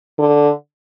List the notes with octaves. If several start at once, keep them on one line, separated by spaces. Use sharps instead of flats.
D3